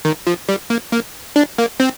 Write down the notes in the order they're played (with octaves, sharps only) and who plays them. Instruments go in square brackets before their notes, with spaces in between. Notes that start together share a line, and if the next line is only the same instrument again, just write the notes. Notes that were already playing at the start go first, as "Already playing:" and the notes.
[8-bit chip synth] D#3
F3
G3
A#3
A#3
D4
A#3
C4